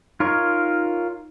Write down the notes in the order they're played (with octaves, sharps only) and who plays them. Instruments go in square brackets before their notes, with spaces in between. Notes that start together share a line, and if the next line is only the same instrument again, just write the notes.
[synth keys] D#4 [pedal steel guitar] F4 A#4 C#5